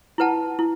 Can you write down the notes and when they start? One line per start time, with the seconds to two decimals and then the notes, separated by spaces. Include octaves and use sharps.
0.18 E4 B4 F#5 A5
0.59 E4